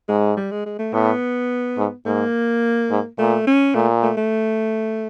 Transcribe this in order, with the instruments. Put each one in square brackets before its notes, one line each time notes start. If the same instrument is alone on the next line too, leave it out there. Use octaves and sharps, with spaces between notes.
[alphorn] G#2 [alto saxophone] G#3
[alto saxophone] G3
G#3
G#3
A3
[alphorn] A2 [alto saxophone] B3
[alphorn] G#2
[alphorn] G#2 [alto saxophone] A#3
[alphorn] G#2
[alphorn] A#2 [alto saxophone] A3
[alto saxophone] C#4
[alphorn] A#2 [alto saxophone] A3
[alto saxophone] A3
A3